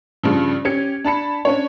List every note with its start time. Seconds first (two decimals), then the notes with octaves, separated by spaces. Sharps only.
0.23 G2 C#3 F3
0.65 C#4 G4 G#6 C#7
1.04 D4 A5 B5 C#7
1.45 C#4 D4 C#5